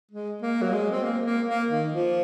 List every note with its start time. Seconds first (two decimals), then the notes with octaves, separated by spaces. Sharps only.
0.11 G#3
0.42 A#3
0.62 F#3
0.72 G#3
0.91 C4
1.03 A#3
1.25 A#3
1.48 A#3
1.70 D#3
1.93 F3